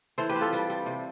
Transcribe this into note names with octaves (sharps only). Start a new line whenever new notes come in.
E3 A4 C5
G4 B4
C4
F4 A4
G3
G3
C3